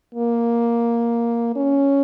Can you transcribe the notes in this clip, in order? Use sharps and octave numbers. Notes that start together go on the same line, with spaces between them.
A#3
C#4